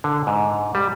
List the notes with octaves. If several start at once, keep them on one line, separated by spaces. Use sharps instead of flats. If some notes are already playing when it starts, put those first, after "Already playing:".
D3
G#2
G3